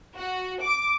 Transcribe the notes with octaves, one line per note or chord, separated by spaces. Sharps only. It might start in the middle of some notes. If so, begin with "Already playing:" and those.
F#4
D6